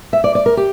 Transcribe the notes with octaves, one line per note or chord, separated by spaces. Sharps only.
E5
D5
D5
A#4
G4